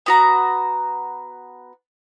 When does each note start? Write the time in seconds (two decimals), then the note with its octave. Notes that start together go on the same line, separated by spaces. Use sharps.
0.06 B3 F#4 A#5